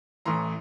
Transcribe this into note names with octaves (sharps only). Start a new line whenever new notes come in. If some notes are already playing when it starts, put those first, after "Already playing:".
A1 A2 E3 A#5 C6